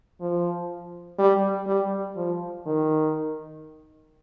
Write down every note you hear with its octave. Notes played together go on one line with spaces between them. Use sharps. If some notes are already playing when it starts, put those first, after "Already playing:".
F3
G3
G3
F3
D#3